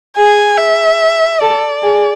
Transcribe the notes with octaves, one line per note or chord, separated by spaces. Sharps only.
G#4 G#5
E5
A4 D5
G#4